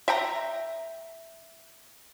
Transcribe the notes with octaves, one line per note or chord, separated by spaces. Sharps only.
E5 G5 A#5